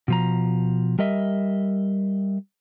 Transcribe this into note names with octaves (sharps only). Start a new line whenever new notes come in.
B2 F3 A#5
G3 A#4 D#5 E5